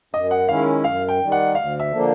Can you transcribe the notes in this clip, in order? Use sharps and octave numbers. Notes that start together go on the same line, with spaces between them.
F#2 D#5
F#5
D#3 G#3 C#4 E4 F5
F#2 F5
G5
D#3 G3
F#5
D2 F5
E5
D3 F3 A#3 D4